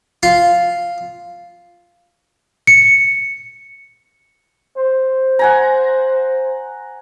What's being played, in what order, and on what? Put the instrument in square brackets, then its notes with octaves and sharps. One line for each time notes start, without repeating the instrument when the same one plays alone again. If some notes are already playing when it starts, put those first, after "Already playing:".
[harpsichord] F4
[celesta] C#7
[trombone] C5
[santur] F#5 G#5 A#5